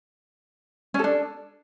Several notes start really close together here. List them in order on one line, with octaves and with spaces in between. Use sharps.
C#4 A4 D4